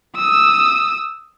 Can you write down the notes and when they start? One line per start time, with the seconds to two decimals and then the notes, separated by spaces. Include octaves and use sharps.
0.16 D#6 E6